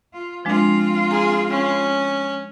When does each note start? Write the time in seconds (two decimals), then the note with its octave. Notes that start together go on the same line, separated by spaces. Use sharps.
0.13 F4
0.45 F3 G#3 C4 D4 F4
1.11 G#4 A#5
1.51 C#4